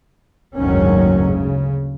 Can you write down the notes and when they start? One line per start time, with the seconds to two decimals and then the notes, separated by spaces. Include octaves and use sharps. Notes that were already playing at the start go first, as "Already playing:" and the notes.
0.57 F#1 D2 G#2 D#3 F#3 C#4
1.28 C#3